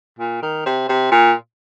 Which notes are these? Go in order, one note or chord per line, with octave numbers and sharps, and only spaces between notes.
A#2
D#3
C3
C3
A#2